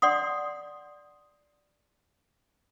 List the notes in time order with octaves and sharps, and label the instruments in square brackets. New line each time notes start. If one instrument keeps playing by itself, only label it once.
[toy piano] D5 F#5 C6 D#6